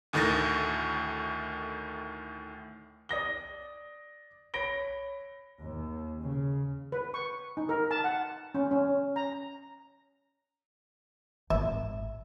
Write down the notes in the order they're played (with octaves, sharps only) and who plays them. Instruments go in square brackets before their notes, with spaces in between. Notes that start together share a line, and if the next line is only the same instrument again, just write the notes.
[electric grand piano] D2 A2 D#3 A3 A6 A#6
[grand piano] D5 D#6 A#6 G7
C#5 B5 A#6 D7 G7
[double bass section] D#2
C#3
[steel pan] B4
C#6
D#4
A#4
A5
F#5
C#4
C#4
A#5
[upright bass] G#1 [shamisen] E5